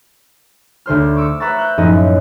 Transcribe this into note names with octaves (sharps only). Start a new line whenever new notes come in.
D2 D3 C5 F6
C#6 D6 E6 C#7
B4 E5 F#5 A#5 C#6 A6
E6 F#6 G6
F#2 A2 F3 C#4 D#4 D#5